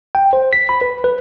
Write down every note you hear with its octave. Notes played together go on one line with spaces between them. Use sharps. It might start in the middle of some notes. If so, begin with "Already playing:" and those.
G5
C5
B6
B5
B4
B4